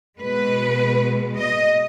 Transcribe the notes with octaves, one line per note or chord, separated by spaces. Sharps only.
B2 G#3 B4
D#5